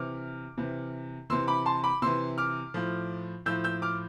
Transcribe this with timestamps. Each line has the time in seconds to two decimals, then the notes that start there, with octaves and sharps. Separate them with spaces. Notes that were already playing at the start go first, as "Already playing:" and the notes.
Already playing: C3 E3 D6 F6
0.58 C3 E3
1.30 C3 E3 C6 E6
1.48 B5 D6
1.66 A5 C6
1.84 B5 D6
2.02 C3 E3 C6 E6
2.38 D6 F6
2.74 A2 F3
3.46 A2 F3 E6 G6
3.64 E6 G6
3.82 D6 F6